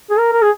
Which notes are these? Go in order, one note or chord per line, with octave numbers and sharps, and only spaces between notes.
G#4
A#4
A#4
G#4